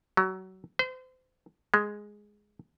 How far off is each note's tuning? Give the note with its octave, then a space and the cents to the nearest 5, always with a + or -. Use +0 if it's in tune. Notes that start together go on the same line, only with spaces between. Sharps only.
F#3 +25
C5 -35
G#3 +0